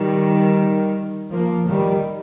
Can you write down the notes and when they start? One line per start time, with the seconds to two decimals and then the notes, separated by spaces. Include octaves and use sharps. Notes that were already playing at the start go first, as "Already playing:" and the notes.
Already playing: D#3 G3
1.32 F3 A#3
1.67 D#3 G3